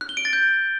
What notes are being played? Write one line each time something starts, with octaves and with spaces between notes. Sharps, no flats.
F#6
G7
D7
A6
G6